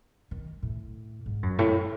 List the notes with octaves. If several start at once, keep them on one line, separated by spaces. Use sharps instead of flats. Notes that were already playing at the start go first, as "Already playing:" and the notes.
D#3
A2
G#2
F#2
A2